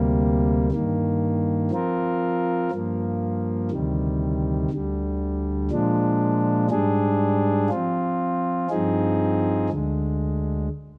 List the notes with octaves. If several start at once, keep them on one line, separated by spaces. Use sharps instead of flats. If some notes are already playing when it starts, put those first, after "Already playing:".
Already playing: D2 C3 G3 A#3
G2 D#3 A#3
F3 C4 F4 A#4
G2 F3 A#3
D2 C3 D#3 G3
D2 D3 G3
A#2 F3 G#3 D4
G#2 G3 D4 G#4
F3 C4 F4
G2 F3 C4 D#4 G#4
D2 D3 G#3